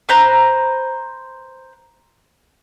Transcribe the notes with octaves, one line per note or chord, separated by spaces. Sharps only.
B4 C5 A#5